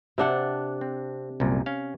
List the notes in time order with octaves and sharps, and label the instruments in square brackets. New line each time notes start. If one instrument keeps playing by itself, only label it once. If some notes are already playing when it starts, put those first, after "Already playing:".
[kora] C3 D4 F#5
[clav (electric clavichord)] C4
C2 F#2 A#2
C#4 F5